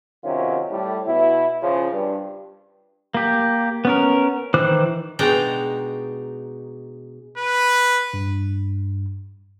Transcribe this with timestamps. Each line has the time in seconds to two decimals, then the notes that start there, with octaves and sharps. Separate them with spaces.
0.24 B1 C3 D#3 F#3 C#4 F4
0.70 A2 G3
1.06 B2 E4
1.62 C#3 F3 F4
1.92 G2
3.14 A#3 G4
3.85 B3 C#4 A#4
4.54 D#3 E3 C5 D6 F#6
5.19 B2 G#3 D4 D#4 G5 A#5
7.38 B4
8.13 G2